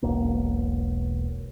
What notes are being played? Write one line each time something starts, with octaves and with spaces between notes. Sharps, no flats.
E1 B1 A#3